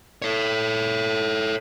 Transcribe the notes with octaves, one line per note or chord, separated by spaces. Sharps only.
A4 C#5